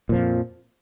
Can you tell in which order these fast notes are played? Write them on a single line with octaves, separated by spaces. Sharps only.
A#2 F3 F2